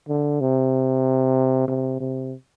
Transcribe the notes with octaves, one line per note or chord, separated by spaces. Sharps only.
D3
C3
C3
C3